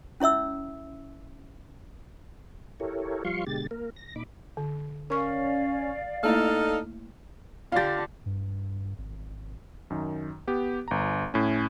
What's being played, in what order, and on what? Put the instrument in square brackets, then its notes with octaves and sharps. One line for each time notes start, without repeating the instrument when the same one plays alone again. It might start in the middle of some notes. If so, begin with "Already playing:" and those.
[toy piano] C#4 E4 C#5 E5 E6
[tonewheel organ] E4 G4 A4 A#4 C#5
F3 G3 F4 F5 C6 C#6
B2 D3 G#3 G4 A6
A#3 A#4
A#6
A#2 D#4 B5 D6
[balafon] D3
[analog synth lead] C#4 [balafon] A#4 C#6 [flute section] D5 F5
[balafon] A3 A#3 E4 [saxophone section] D#4 A4 [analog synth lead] F6
[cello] D3 D4 [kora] F4 G4 [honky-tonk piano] F5 A6
[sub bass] G2
G#1
[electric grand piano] F#2 D#3
B3 G4
G1 A#5
A2 C#4